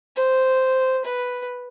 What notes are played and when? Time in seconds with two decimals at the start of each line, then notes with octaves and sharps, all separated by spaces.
0.16 C5
1.05 B4